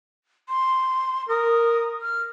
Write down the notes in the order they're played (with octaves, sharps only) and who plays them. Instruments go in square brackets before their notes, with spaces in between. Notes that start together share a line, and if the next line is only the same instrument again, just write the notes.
[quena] C6
[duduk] A#4 [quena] D#6
[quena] F6